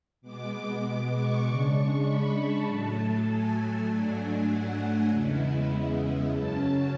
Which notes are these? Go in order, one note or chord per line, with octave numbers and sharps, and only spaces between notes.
B2 G#3 B3 D6
D6
C#6
C#3 G#3 D4 C#6
B5
A5
A2 F#3 A3
G#5
G#2 F#3 A3 D4
F#5
G#5
E2 C#3 G#3 B3 E4
F#2 C#3 F#3 C#4 A5